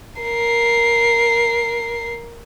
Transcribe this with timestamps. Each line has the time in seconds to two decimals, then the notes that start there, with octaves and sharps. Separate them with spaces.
0.22 A#4 C7